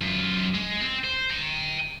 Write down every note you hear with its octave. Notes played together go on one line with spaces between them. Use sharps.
F#2 F4
G#3
C4
C5
G5 A#5